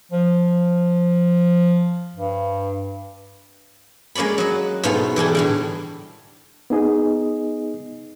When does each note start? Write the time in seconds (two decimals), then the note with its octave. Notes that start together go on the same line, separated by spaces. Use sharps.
0.12 F3
2.16 G2
4.15 G#3 A#3 C#4 D5 B5
4.38 F#3 D#5
4.83 G#2 B2 A3 B3 F4
5.16 E3 G3 G#4 A4
5.35 A2 D3 G3
6.70 B3 D#4 G#4 D#5